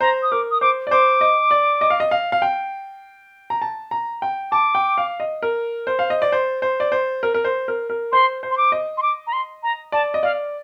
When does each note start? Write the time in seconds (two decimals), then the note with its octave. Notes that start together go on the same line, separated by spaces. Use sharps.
0.01 C5 A#5
0.23 D#6
0.32 A#4 D6
0.51 D#6
0.61 C5 D6
0.87 D5
0.91 C5 D6
1.21 D#5
1.51 D5
1.81 D#5
1.90 F5
2.00 D#5
2.11 F5
2.32 F5
2.42 G5
3.50 A#5
3.62 A5
3.91 A#5
4.22 G5
4.52 A5 D6
4.75 G5
4.98 F5
5.20 D#5
5.42 A#4
5.87 C5
5.99 F5
6.10 D#5
6.22 D5
6.32 C5
6.62 C5
6.80 D5
6.92 C5
7.23 A#4
7.34 A#4
7.45 C5
7.68 A#4
7.90 A#4
8.12 C5 C6
8.43 C5
8.51 C6
8.58 D6
8.72 D#5
8.98 C6
9.03 D6
9.27 A#5
9.33 C6
9.63 A#5
9.92 D5 A5
10.14 D#5
10.23 D5 F5